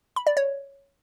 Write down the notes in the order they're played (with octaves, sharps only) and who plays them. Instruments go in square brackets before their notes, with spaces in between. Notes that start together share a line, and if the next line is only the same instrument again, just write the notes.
[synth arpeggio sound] B5
D5
C#5